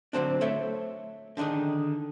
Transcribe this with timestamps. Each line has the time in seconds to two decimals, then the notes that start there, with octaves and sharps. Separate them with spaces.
0.13 D3 F#3 C4 D4
0.41 A3 A4 C#5 E5 G5
1.37 D3 D#3 D4 D#4 G#4